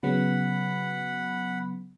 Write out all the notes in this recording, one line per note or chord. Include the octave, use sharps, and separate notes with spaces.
C#3 F#3 B3 F#5 B5